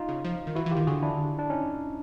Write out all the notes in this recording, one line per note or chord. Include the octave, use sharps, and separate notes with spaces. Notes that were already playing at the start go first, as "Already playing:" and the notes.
Already playing: D#4 F4
C#3
F3
D#3
E3 E4 F#4
E3
F4 G4
D#3
D3 F#4 G#4
D4 E4
D4
C#4 D#4